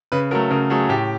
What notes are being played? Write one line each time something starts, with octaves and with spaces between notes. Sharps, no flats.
C#3 B4
F#3 A3 A#4
C#3 A#4
F#3 A3 G#4
A2 G4